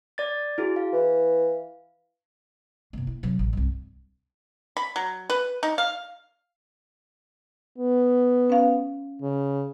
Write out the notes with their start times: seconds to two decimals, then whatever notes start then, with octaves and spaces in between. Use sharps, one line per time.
0.18 D5 A6
0.58 E4 F#4 G#4
0.76 F5
0.93 E3
2.93 C3 A#3
3.07 E4
3.23 C3 F#3
3.39 A1
3.53 C2 G2
4.77 B5
4.96 F#3
5.30 B4
5.63 D#4
5.78 F5
7.78 B3
8.50 C#4 F5
9.22 C#3